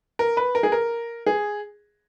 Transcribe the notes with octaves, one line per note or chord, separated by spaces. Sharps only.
A#4
B4
A#4
G#4
A#4
G#4